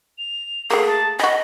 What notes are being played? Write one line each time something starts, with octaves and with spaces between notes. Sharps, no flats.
F7
A3 A#3 G#4
A5
F#4 G#4 D#5 B5